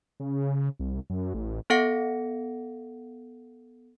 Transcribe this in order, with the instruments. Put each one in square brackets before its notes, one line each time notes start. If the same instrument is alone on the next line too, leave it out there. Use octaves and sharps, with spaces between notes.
[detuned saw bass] C#3
C2
F#2
A1
[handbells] B3 A4 F5 F#5 A#6 C#7